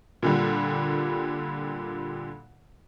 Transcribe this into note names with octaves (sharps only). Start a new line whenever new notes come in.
A#2 D3 G3